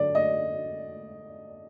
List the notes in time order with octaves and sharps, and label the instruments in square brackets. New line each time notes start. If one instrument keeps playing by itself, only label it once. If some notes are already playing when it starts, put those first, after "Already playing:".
Already playing: [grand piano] D3 F#3 A3 [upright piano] D5
[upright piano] D#5